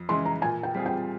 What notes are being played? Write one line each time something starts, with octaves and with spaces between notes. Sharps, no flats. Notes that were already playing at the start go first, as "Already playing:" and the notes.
Already playing: F2
C#3 E3 G#3 C6
A#5
A#2 G#5
G5
G3 C4 F4 G#4
G5